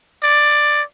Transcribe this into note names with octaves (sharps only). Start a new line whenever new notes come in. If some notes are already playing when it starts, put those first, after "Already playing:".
D5